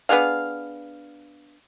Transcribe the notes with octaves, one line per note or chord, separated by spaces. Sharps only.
B3 D4 G#4 F5